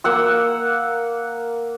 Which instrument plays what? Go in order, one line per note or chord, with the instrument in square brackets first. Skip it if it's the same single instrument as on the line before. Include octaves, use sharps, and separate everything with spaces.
[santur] A#3 F#5 E6